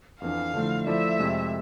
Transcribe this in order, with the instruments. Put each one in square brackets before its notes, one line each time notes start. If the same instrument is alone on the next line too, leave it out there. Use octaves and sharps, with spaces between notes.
[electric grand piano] F2 E3 B3 D4 [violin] F5
[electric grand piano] D3 F3 A3 E4
[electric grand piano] F3 A3 E4 A4 D5 [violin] E5
[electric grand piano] F2 C3 G#3